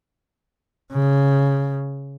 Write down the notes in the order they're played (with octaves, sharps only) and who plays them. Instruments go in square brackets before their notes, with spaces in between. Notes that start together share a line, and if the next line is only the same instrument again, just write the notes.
[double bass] C#3